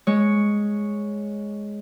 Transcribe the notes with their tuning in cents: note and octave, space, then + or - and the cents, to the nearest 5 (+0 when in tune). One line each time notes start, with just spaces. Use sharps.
G#3 +0 C#5 +0